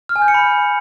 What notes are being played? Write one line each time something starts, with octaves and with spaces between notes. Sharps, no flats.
F6
G#5
G6
C#7
B5